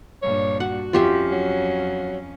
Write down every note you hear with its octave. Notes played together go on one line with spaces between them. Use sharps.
G2 A#2 C#5
F#4 F#5
F2 C#4 F4 G4 E5
F#3